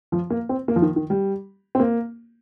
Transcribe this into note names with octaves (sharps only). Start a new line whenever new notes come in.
F3
A#3
C4
A#3
F3
D#3
D#3
G3
C4
A#3